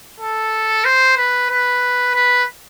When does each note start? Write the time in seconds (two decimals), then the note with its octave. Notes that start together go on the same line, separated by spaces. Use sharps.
0.20 A4
0.85 C5
1.17 B4
1.50 B4
2.14 B4